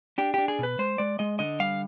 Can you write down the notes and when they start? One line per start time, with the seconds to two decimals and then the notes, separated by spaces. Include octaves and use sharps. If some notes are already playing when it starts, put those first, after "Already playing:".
0.18 D4 G4
0.34 D4 G4
0.48 G#4
0.59 B2 B4
0.79 G#3 C5
0.98 G#3 D5
1.19 G#3 D#5
1.39 D3 D#5
1.60 G3 F5